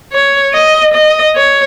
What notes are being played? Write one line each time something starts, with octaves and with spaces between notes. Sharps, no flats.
C#5
D#5
D#5
C#5